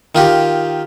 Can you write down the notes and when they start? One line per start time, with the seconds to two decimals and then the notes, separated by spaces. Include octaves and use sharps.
0.15 D#3 F4 G4